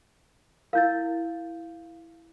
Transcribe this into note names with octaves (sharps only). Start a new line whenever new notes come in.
E4 A#4 F5 G6 A6